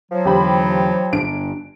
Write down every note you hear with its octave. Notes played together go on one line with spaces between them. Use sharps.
F3 F#3
E2 D3 G4 C5 B5
G1 D4 D7